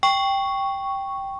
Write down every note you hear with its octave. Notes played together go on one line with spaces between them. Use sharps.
G5 C#6